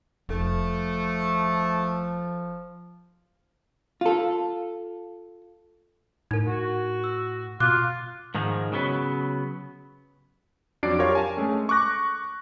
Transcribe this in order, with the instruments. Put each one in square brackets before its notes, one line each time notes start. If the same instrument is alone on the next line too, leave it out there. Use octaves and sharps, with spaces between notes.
[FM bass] F1 [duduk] F3 [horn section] A3
[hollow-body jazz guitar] F4 A4
[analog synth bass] A2 [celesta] D#4 A#4
[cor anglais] F#4
[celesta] E6
[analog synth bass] B2 [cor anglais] F4 [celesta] D6 [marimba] F#6
[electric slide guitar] G#2 D#3 F3 G#3
C#3 F#3 B3
[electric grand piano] F2 F#3 D4 D5 C7 D7
F4 G4 A#4 C#5 F5
G#5 A5
G#3 A3 C#4
C#6 D6 F#6 A#6